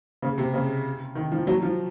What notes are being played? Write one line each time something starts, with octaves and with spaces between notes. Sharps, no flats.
C#3
C3
C#3
D#3
F3
F#3
F3